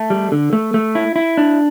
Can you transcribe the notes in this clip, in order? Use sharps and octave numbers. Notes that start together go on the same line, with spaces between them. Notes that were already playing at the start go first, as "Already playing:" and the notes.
Already playing: A3
G3
D3
A3
A3
E4
E4
D4